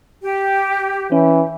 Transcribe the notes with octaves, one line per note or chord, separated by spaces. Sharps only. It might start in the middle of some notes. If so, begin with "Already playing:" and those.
G4
E3 C#4